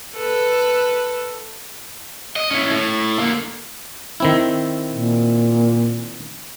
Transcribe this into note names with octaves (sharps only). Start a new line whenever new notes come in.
A4 B4
D#5
C#4 E4
A2
D3 A#3
D#3 C4 E4
A#2